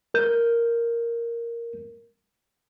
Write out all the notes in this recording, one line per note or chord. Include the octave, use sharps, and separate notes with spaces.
A#4 G6